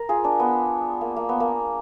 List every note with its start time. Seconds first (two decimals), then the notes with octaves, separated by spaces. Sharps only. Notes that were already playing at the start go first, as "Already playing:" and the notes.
Already playing: A#4
0.09 F4 G#4
0.24 D4
0.40 B3
1.01 A#3
1.16 A#3
1.29 B3
1.40 A#3